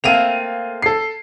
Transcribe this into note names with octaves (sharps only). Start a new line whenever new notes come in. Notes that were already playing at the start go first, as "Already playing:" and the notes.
A3 A#3 C4 F5 D#7 F7
A4 C7